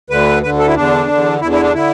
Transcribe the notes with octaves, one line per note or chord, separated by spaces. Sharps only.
D2 D3 B4
D2 D3 B4
A4
E4
E2 D3 D4
E2 D3
E2 D3 E4
E4
D4
D3 E4